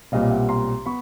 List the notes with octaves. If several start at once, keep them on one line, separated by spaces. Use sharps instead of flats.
B1 A#2 G3 C4 D#5 F5
F5
E5 F#5
A#5 C6
B3 B5 C#6